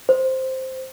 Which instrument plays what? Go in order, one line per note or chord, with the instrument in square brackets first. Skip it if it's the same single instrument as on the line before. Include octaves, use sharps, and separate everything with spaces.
[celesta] C5